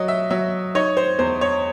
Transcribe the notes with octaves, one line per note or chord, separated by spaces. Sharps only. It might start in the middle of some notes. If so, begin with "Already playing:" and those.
Already playing: F#3 D#5
E5
F#3 E5
D#4 C#5
C5
E2 C5
C#5